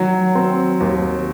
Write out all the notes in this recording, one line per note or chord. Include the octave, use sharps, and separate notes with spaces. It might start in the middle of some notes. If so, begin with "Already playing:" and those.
Already playing: D#3 F#3
C4
D#2